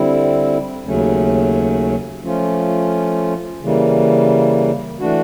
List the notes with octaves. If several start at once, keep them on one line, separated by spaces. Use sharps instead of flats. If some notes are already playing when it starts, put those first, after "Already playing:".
Already playing: D3 G3 C4 E4
D#2 C#3 F#3 A3 C#4
F3 A3 C#4 F4
C#3 E3 G3 A#3
E3 A3 D4 F#4